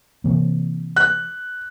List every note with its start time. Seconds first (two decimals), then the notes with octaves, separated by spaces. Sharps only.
0.24 C3 E3 A#3
0.96 F#6